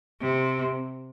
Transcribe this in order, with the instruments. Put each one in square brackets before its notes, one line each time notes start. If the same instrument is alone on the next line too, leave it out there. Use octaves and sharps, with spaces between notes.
[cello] C3